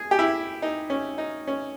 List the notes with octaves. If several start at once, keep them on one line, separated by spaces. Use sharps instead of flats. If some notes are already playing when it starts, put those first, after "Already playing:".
Already playing: G#4
G4
E4
D#4
C#4
D#4
C#4